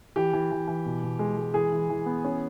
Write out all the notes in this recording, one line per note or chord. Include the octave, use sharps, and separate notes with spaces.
E3 G4
E3
E3
E3
B2
B2
G#3
G#3
E3 G#4
E3
E3
B3
C#4